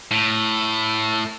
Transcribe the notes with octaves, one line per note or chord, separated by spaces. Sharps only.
A2